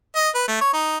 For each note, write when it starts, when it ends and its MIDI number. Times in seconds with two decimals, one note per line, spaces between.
0.16 0.29 75
0.35 0.44 71
0.48 0.60 57
0.61 0.72 73
0.73 0.98 63